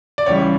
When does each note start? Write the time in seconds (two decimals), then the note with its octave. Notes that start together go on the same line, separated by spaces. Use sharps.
0.18 D5
0.26 C#2 C#3 E3 G3 C#5